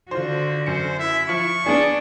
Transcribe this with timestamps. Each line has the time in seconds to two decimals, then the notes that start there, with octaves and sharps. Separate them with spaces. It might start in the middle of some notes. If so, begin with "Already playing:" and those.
0.11 D3 F4 F#4 C5
0.66 F#2 C5 C#7
0.99 E4 E5
1.29 F3 C#6
1.66 B3 D4 G#4